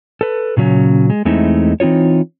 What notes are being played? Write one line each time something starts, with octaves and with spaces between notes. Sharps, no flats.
A4 B4
A#2 C#3 F#3 C#4
G#3
E2 G#3 A3 C4 D#4 E4
E3 C4 D#4 F4 C#5